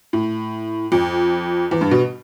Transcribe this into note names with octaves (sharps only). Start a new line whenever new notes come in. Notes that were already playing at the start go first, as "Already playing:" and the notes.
A2
F2
E2
G2
B2